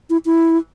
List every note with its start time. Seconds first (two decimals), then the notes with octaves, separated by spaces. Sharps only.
0.10 E4
0.26 E4